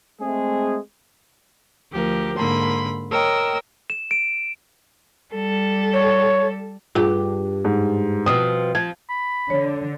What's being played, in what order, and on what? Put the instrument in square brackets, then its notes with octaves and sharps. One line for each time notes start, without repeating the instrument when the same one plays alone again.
[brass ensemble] G#3 A3 C4 G#4
[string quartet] D2 F3 G4 A#4
G#2 D3 A#3 B5 C6
A#4 C#5 D#5 G5 E6
[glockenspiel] E7
D7
[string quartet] G3 A4
[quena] C#5
[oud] G2 G4 [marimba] F4 G#4
[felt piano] G#2
[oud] B2 F3 C4 [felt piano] D#6
[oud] F3 [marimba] G#6
[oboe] B5
[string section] D3 [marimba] C#5